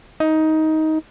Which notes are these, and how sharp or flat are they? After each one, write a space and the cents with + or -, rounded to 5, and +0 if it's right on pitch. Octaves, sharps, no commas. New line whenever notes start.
D#4 +15